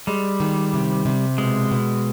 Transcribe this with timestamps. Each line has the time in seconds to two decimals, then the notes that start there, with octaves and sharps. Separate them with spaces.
0.07 G3 G#3
0.40 D#3
0.74 C3
1.05 C3
1.38 B2 G#3
1.71 B2